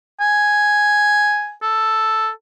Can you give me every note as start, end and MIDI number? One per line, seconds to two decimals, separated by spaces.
0.21 1.53 80
1.63 2.29 69